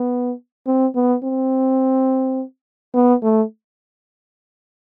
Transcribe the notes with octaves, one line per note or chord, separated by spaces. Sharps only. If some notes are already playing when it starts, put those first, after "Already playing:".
Already playing: B3
C4
B3
C4
B3
A3